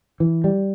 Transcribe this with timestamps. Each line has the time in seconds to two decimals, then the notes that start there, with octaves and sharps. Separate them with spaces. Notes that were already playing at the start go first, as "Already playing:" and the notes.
0.20 E3
0.44 G3